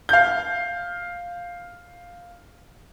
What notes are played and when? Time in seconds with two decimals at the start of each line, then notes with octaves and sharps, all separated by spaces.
0.09 F5 G6